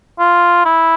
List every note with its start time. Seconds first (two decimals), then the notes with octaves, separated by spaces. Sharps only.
0.19 F4
0.65 E4